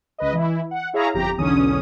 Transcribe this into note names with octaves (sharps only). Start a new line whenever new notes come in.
C#2 B4 D#5
E3 E4
F#5
E4 G#4 C#5 E5 F5 A#5
G1 F2 G4 A#5
B1 E2 D3 C#4 D#6